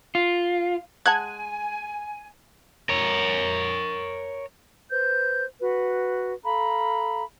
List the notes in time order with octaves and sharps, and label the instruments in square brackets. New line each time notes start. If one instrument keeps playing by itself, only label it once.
[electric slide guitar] F4
[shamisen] G#3 F#5 A5 [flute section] G#5 [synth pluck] F#6 G#6
[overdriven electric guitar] A#4 C#5
[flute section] B4 C5 G6
F#4 B4
A4 F5 A#5 B5